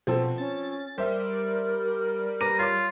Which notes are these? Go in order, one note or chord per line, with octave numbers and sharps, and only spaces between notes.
B2 F3 C4 A4
C#4 A6
G3 A#4 C5 E5
B4 A#5 D6 D#7
F4 C#5 D6